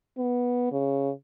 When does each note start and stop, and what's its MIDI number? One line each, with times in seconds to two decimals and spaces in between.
0.18 0.67 59
0.72 1.11 49